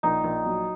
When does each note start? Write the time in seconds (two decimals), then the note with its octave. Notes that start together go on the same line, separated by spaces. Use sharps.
0.03 A#1 D#4
0.24 A#1
0.46 F#3